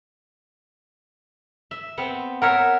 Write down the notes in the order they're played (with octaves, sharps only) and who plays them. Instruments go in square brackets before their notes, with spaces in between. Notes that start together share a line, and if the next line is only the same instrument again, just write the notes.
[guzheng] E5
B3 C4
[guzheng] A#4 C#5 E5 [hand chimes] F#5